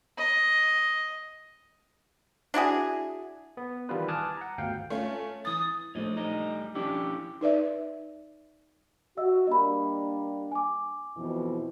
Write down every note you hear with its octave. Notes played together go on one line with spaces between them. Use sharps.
D#5
D4 E4 F#4 G#4
B3
D#3 E3 G3 E4 F4 B4
G#5 A5 D6 D#6 F6 F#6
F#5 A#5
G1 D2 F5 G5
A3 C#4 F4
E3 D#6 A6
A#1 A3 C5 C#5 D#5
G3 D#4 D#5
F3 C#4 D4 E4 G4
D#4 B4 D5 E5
F#4 D#5 E5 E6
G3 A#3 D4 D#5 B5
G#5 D6
F2 B2 E3